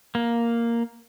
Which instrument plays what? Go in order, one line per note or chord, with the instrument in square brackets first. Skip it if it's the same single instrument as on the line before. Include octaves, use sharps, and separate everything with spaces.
[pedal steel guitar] A#3